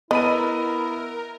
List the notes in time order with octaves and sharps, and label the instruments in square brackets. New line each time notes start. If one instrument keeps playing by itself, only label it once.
[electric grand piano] B3 B5 D#7 [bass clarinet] E4 [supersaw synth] A#4 [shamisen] D#5